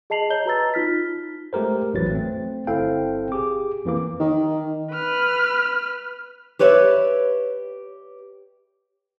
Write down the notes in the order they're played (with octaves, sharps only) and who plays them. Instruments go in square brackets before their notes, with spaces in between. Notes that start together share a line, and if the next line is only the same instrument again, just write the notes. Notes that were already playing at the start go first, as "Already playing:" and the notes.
[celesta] G#4 D#5 A5 C7 F7 F#7
C#5 D#5 A#5 G6 G7
F#4 B4 A#5 E6 A6
D#4 F4 F6 B6
[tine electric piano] G#3 A3 G4 A#4 C5
A1 F2 E3 F#3 B4 A6
A3 C4
G1 C4 E4 A4 F5 G5
G4 G#4 D6
F2 E3 A#3 D6
[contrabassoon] D#3
[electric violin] B4 F6
[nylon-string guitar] G4 B4 C#5 D5 E5